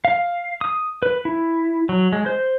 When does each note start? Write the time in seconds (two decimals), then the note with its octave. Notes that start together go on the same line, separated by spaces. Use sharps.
0.05 F5
0.61 D#6
1.03 B4
1.25 E4
1.89 F#3
2.13 G#3
2.26 C5